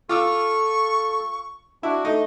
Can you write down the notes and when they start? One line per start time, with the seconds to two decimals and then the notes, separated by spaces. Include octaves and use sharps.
0.09 F4 A4 C#6 D6 E6
1.83 D4 E4 F#4
2.05 A3 D#4